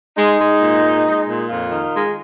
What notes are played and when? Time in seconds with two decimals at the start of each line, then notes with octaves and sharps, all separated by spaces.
0.16 G#3 D#4
0.39 G#3
0.61 A#2
0.83 G#3
1.05 G#3
1.27 A#2
1.49 F2 F4
1.72 D#3
1.94 G#3